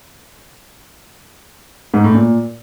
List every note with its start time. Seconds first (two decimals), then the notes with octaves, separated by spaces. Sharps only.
1.94 G#2
2.04 A2
2.14 A#2